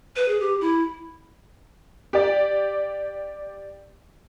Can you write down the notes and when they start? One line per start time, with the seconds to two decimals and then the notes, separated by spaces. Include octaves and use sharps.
0.16 B4
0.28 G#4
0.40 G4
0.61 E4
2.13 G4 D5